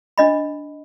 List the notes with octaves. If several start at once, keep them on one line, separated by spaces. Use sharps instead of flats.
D4 D#5 B5